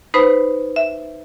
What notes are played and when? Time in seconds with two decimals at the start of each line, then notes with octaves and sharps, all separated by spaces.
0.14 D#4 B4 C5 B5
0.76 E5